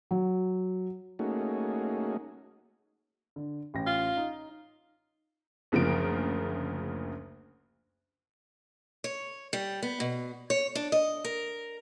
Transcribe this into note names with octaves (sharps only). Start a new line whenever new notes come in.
F#3
A3 A#3 C#4 D#4 F#4 G#4
D3
A1 G5 A#6
F4
D#4
F#1 D2 C#3 F3 A#3 D7
C#5
G3
B3
B2
C#5
D4
D#5
A#4